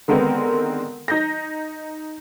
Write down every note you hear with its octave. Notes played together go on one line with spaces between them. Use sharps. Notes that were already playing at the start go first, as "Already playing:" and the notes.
D3 D#3 G#3 B3 C4 A#4
D#4 G6 A#6